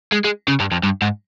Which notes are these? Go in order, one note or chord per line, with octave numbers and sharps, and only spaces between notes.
G#3
G#3
C#3
G2
F2
G2
G#2